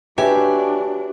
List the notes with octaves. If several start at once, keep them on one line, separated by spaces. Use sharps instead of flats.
D4 F#4 G4 B4 C#5 E5 G#5